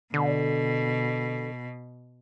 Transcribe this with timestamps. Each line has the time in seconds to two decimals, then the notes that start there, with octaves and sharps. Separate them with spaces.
0.14 B2 D3